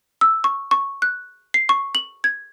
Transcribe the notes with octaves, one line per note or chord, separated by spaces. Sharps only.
E6
C#6
C#6
F#6
C7
C#6
F#7
G#6